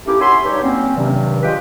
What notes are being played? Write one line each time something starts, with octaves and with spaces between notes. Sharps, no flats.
A3 A#3 C#4 D#4 E4 G4
F#4 C#5 E5 G#5 B5 C6
G2 D#4 G4 C#5
F#3 A#3 C4 C#4
G2 C3 D#3 F#3
G#3 F4 G4 B4 G5